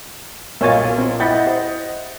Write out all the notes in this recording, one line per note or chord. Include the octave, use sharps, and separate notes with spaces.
B1 A#2 A#3 C#5 D#5 E5 G#5 A6
C4 F4
E4 D#5 F#5 G5 B5 G6 A6
G4 C5